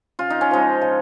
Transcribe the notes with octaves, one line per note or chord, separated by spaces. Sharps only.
C#3 F4
D#4
C#4
F3 G#3 D#4
C#3